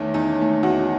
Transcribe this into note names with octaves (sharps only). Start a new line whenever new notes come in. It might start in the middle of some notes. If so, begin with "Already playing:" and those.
Already playing: E2 D#3 A3 C#4
E2 D#4
D#3 A3
E2 F#4